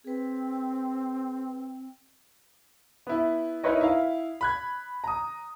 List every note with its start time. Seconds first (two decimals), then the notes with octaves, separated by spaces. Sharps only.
0.05 C4 G#4 B4
3.07 B3 E4
3.63 D#4 E4 A#4 B4 C#5 D#5
3.81 E4 F5
4.41 B5 F#6 G#6
5.04 A#5 D#6